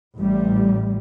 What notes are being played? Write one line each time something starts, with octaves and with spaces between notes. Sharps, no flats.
A1 G3